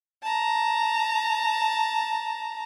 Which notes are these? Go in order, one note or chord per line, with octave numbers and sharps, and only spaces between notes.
A5 A#5